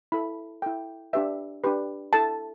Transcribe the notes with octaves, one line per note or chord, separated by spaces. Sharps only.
E4 A4 B5
E4 A4 G5
D4 G4 B4 E5
D4 G4 B4
E4 A4 A5